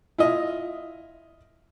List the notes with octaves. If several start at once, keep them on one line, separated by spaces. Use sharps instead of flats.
E4 F4 D#5